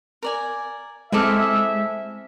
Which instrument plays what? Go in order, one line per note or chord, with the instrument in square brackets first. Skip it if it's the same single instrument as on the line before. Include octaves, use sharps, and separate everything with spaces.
[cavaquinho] A#4 D5 G#5
[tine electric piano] G#3 [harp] C4 D6 F6 [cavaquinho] E4 G#4 A4 [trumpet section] E5